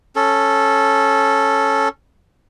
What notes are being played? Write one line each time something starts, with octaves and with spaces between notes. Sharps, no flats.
C#4 A4